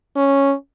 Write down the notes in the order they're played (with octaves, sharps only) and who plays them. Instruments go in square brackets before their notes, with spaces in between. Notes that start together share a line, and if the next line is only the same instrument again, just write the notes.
[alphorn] C#4